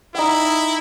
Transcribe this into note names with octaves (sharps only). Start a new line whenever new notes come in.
D#4 E4 G5